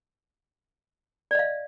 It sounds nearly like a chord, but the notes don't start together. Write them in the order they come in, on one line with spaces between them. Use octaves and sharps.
D5 D#5 F5